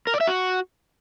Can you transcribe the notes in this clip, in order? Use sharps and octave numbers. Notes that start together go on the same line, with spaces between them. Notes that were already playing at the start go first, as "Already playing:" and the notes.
A#4
D5
E5
F#4